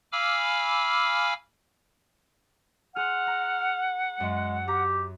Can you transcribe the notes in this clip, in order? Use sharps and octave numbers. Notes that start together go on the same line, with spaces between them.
F5 G#5 B5 D6 E6 F6
G#4 F#5 C6 F6
A#5
F#2 G#3
G4 A#5